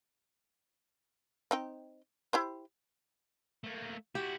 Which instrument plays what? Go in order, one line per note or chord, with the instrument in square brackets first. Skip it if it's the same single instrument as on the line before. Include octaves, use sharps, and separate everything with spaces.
[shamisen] C4 D#4 G5
E4 G4 C5
[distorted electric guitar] A3 A#3
[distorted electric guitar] E4 F#4 [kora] G4